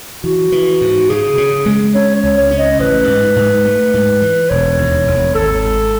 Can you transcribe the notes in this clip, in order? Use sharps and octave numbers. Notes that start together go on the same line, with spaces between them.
E3 F#4
E3
G#2
C#3 G#4
C#3
G#3
C#4 C#5
C#5
C#2
C#5
C#4
D#5
A1 B4
G#2
G#2
A3
G#2
E3
E1 C#5
D#2
E1
G#1 A4
G#1